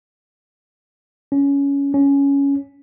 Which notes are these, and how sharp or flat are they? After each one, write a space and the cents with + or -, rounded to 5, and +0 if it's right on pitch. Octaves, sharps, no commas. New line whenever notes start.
C#4 +15
C#4 +10